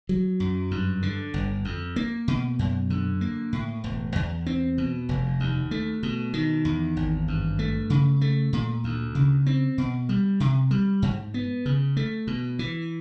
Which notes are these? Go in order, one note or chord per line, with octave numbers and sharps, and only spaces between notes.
F#3
F#2
G2
D3
G1
F2
A#3
B2
F#2
D3
A#3
A2
E1
E2
C4
B2
F1
D#2
A3
B2
D#3
E2
G#1
G2
A3
C#3
A3
A#2
D2
C#3
C4
B2
G3
C3
G3
G#2
B3
C#3
A3
B2
E3